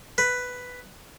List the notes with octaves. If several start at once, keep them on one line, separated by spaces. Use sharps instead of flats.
B4